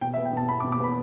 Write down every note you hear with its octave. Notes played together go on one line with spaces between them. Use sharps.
B2 G5
E5
B3
G5
B2 A5
B3 B5
D6
B2
D6
B3 B5